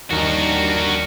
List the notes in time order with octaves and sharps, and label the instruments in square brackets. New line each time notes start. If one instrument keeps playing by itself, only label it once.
[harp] D#2 [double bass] G3 D4 [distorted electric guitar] F#4 A#4